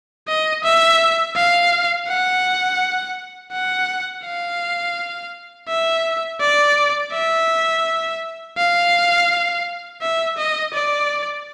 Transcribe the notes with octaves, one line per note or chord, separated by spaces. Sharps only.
D#5
E5
F5
F#5
F#5
F5
E5
D5
E5
F5
E5
D#5
D5